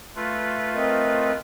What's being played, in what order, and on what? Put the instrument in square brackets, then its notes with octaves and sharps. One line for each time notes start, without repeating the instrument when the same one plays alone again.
[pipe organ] A3 F4 B4
[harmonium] C4 A#4 D#5